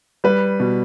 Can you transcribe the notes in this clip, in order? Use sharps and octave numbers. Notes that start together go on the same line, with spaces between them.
G3 B4
B2